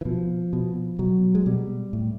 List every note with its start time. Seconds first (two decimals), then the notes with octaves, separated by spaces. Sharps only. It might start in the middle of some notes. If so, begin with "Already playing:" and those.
0.01 E3
0.05 B2 F3
0.53 B2
0.99 B2 F#3
1.35 G#3
1.46 B2 G3
1.93 A2